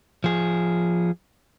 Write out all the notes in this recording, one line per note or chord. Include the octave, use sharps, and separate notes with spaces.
F3 G#4